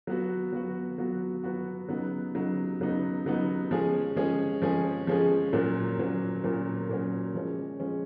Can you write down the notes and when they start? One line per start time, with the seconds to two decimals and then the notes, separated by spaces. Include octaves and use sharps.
0.07 F#3 B3 F#4
0.52 F#3 B3 F#4
0.98 F#3 B3 F#4
1.43 F#3 B3 F#4
1.89 C#3 F#3 B3 D#4
2.34 C#3 F#3 B3 D#4
2.80 C#3 F#3 B3 D#4
3.25 C#3 F#3 B3 D#4
3.71 F3 G#3 C#4 G#4
4.16 F3 G#3 C#4 G#4
4.62 F3 G#3 C#4 G#4
5.07 F3 G#3 C#4 G#4
5.53 A#2 F#3 C#4
5.98 A#2 F#3 C#4
6.44 A#2 F#3 C#4
6.89 A#2 F#3 C#4
7.34 F3 G#3 C#4
7.80 F3 G#3 C#4